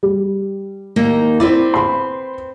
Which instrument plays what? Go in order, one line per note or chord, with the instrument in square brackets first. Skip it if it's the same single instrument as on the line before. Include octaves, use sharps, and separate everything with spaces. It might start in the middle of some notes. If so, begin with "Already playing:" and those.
[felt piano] G3
[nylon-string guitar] D#2 A#3 D#4
[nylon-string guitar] C4 B4 D5 [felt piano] E4
[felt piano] B5 C6